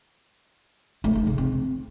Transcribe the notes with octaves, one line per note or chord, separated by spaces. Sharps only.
A3
D#4
C#3
C4